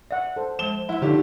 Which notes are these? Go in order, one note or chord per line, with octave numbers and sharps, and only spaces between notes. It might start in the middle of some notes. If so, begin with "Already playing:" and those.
D5 E5 F#5
A4 C5
F3 G#3 C5 A5 E7 G7
F3 E4 E5 F#5 C6
D3 D#4 F4 G4 C#5